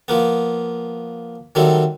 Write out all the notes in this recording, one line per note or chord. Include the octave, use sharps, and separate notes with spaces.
F3 A#3 B3
D#3 F#3 G3 A3 C4